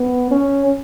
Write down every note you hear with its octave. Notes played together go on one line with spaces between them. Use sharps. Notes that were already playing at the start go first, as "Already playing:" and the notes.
Already playing: B3
C#4